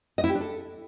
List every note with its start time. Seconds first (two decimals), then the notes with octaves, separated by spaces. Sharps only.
0.18 D#5
0.24 E4
0.29 G4
0.35 D4
0.41 A4